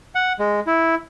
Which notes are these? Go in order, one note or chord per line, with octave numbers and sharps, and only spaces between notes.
F#5
G#3
E4